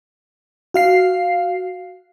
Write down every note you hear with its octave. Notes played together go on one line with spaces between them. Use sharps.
F#4 F5 C7